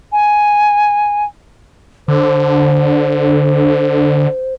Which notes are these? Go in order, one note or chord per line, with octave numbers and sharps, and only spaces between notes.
G#5
D3 C5